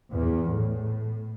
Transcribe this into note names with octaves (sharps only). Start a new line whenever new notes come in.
E2
A2